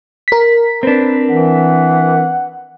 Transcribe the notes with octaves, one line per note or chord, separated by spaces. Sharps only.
A#4 B6
C4 D4 B4
E3 F#5